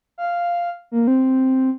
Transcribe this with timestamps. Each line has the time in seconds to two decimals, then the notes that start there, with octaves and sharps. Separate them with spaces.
0.18 F5
0.91 A#3
1.07 C4